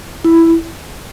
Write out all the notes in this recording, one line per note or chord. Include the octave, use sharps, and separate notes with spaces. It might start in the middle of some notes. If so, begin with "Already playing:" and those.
E4